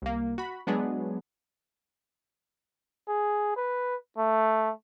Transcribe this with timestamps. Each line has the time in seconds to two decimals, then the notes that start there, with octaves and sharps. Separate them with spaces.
0.02 C2 A#3
0.38 F#4 B5
0.67 F#3 G#3 B3 D4 G#4
3.08 G#4
3.56 B4
4.18 A3